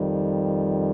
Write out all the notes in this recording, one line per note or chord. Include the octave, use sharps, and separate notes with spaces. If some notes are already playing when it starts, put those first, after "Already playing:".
Already playing: F2 D#3 G3